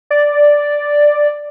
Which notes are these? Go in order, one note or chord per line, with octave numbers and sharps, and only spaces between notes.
D5